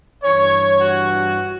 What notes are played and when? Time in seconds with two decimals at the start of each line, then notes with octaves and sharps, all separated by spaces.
0.23 G2 E3 C#5
0.81 F#4